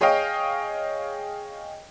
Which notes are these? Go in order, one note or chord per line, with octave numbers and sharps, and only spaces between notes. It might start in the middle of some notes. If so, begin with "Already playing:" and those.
G#4 C#5 D#5 F5 G5